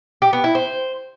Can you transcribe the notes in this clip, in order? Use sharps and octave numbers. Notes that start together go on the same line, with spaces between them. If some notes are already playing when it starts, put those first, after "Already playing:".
G4
B3
E4
C5